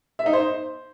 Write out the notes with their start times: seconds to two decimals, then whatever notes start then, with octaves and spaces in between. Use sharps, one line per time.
0.19 E5
0.26 D#4
0.33 C5